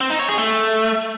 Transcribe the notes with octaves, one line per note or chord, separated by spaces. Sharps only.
C4
D#4
C#5
G#4
A3